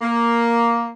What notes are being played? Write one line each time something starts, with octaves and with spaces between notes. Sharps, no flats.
A#3